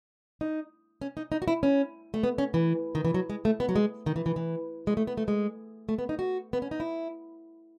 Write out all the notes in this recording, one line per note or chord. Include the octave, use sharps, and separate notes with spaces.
D#4
C#4
D#4
D#4
F#4
E4
C#4
A3
B3
C#4
E3
D#3
E3
F#3
G#3
A3
B3
F#3
G#3
D#3
E3
E3
E3
G#3
A3
B3
A3
G#3
A3
B3
D#4
F#4
B3
C#4
D#4
E4